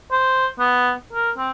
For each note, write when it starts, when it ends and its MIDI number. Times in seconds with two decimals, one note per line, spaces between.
0.12 0.47 72
0.59 0.92 59
1.13 1.31 70
1.38 1.51 60